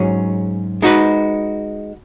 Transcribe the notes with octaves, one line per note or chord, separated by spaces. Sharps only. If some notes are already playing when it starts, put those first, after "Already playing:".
Already playing: G#2 F#3 C#4 G#4 C#5
G#3 D#4 F#4 B4